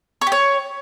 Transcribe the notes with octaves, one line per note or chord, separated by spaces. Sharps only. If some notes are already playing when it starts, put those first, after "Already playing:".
C#5
G4
C#5